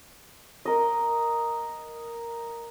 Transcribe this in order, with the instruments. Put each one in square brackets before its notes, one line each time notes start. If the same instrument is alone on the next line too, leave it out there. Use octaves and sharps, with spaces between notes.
[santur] A#4 D#5